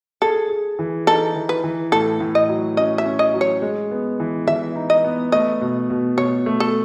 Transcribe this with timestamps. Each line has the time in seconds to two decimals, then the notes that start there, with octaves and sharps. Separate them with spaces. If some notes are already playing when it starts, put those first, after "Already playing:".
0.22 G#4 A4
0.50 G#4
0.79 E3
1.07 D#4 A4
1.36 E3
1.49 B4
1.64 E3
1.92 A2 A4
2.20 A2
2.35 D#5
2.49 F#3
2.77 C#4 D#5
2.98 E5
3.05 C#4
3.19 D#5
3.34 F#3
3.41 C#5
3.62 G#3
3.91 B3
4.20 E3
4.47 E3 E5
4.76 D#4
4.90 D#5
5.04 B3
5.32 A3 D#5
5.61 B2
5.90 B2
6.17 B2 C#5
6.46 A3
6.60 A4